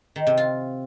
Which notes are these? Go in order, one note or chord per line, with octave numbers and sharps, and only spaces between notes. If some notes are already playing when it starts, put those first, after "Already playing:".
D#3
C3
F4